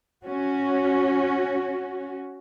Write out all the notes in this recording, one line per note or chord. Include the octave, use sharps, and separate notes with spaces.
C#4 F#4